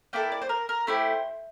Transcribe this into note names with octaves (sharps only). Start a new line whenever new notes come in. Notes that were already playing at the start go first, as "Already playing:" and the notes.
A#3 E4 A4 G5
D5
C5
A#4
A#4
A3 E4 G4 C5